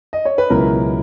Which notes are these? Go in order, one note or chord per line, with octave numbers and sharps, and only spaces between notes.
D#5
C#5
B4
C#2 B2 F#3 C#4 E4 A#4